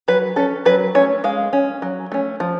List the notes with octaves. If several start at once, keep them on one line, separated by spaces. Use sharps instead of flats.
F#3 B4
C#4 A4
F#3 B4
A3 C#4 C#5
G#3 F5
C#4
F#3
A3 C#4
F3